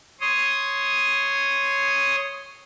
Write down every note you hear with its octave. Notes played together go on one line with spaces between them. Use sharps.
C#5 C6 D#6